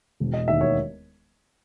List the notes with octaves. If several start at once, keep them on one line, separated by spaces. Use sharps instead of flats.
E1
D#5
D#2 D#3 E5
C#5